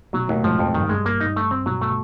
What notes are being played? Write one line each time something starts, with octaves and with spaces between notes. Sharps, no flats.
B2 F#3
D#2 A2
G#2 F3
F2
G2 D#3
G2 G#3
A#3
D#4
A3
C4
B2 F#3
A3